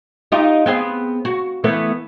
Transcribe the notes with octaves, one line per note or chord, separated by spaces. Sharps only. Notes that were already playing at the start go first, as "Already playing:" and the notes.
D#4 F4 G4
B3 C4 G#4
F#4
E3 A3 B3